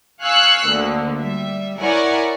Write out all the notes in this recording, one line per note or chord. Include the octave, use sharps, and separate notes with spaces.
F5 G#5 C#6 E6 F#6
D2 D3 A#3
G3 E5
E4 A#4 C#5 D5 F#5 G#5